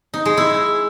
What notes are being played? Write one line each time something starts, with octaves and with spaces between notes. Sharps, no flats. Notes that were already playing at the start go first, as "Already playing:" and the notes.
D#4
G#3
E4